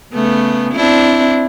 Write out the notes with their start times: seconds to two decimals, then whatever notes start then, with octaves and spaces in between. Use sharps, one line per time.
0.13 C#3 A3 B3
0.74 C4 D4 E4